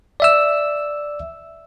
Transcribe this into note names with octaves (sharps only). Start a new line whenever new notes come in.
D5 E5 E6